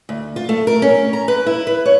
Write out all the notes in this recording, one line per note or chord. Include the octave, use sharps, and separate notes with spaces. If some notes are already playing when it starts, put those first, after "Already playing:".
D2
F4
A3
A#4
C#4
A#5
B4
E4
B4
C#5